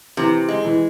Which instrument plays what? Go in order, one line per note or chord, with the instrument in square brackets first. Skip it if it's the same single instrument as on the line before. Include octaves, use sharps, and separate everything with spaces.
[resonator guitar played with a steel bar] C3 [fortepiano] E3
[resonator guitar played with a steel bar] G#3
[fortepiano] E3